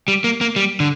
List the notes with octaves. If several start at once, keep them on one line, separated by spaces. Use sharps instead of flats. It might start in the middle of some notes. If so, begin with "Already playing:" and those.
G3
A#3
A#3
G3
D3